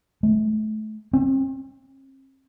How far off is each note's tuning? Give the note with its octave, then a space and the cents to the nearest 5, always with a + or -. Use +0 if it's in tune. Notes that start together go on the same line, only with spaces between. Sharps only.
A3 -30
C4 +45